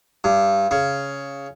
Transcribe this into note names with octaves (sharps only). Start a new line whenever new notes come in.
G2
C#3